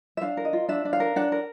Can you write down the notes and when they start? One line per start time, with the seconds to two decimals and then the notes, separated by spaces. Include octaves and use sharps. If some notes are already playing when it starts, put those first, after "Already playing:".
0.17 E5
0.21 D4 F5
0.37 A#4
0.45 D#5
0.53 F4
0.69 D4 E5
0.85 D4
0.93 F5
1.00 A#4
1.16 D4 F#5
1.32 A#4